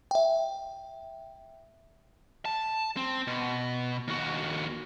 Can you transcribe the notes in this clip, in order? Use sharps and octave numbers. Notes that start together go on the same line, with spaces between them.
E5 G5
A5
C4
B2
D#2 F#4